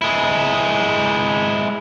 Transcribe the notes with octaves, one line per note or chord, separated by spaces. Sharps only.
G#3 E4